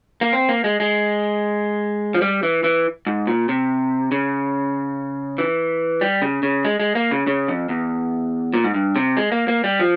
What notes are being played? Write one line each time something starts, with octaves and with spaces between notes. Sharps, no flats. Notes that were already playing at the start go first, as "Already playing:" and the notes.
A#3
C4
A#3
G#3
G#3
F3
G3
E3
E3
G#2
A#2
C3
C#3
E3
G3
C#3
C#3
G#3
G#3
A#3
C#3
C#3
F2
E2
A#2
G#2
G2
C3
G#3
A#3
A#3
G3
F3